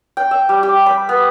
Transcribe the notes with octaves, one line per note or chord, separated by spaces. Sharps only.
G5
E5
G3
G4
B5
B3